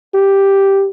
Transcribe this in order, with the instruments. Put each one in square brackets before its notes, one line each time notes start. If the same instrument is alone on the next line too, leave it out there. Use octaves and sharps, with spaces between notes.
[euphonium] G4